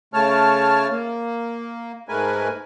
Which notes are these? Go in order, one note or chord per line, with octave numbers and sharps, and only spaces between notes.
C#3 A3 C#5 A5 F6
A#3
G#2 G#3 A3 A#4 B4 G#5